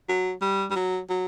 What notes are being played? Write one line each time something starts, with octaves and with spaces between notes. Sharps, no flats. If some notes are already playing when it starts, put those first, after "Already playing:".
F#3
G3
G3
F#3
F#3